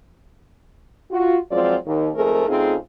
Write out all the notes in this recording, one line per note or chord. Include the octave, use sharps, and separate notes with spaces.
F4 F#4
F3 F#3 G#3 C4 F4 D5
D#2
F2 G#2 A3 C4 G#4 A#4
C#3 A3 C4 D#4 F4 G#4